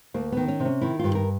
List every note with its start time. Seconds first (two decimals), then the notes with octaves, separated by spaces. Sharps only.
0.14 D2 A#3
0.32 D#3 B3
0.48 C#4
0.60 C3
0.66 C#4
0.81 D#3 E4
0.99 G2 F4
1.15 A#4